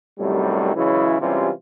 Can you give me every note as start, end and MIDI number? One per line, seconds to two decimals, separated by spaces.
0.18 0.73 42
0.18 0.73 45
0.18 0.73 48
0.18 0.73 51
0.18 0.73 55
0.75 1.15 49
0.75 1.15 52
0.75 1.15 54
0.75 1.15 56
0.75 1.15 64
1.20 1.50 48
1.20 1.50 52
1.20 1.50 55
1.20 1.50 56
1.20 1.50 61
1.20 1.50 65